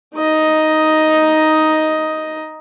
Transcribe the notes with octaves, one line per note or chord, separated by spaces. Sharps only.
D#4 D#5